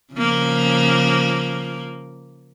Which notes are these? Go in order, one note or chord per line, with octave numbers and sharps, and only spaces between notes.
C#3 F3 A#3